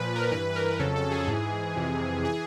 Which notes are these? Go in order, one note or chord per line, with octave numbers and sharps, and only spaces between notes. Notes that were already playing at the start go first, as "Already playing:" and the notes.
Already playing: A#2 F3 B4
A#4
G2 E3 B4
B4
A#4
F2 C#3 F#3 A4
A4
G#4
G#2 E3
F2 C3 E3
E3 G#4